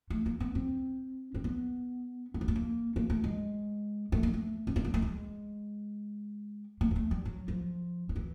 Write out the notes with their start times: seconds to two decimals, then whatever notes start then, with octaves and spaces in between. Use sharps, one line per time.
0.10 A3
0.26 A#3
0.40 B3
0.55 C4
1.34 C4
1.44 B3
2.34 B3
2.41 A#3
2.48 A3
2.56 A#3
2.96 A#3
3.10 A3
3.24 G#3
4.12 A3
4.23 A#3
4.34 A3
4.67 C4
4.76 B3
4.85 A#3
4.94 A3
5.02 G#3
6.81 A#3
6.91 G#3
6.96 A3
7.11 G3
7.25 F#3
7.48 F3
8.09 D#3
8.16 E3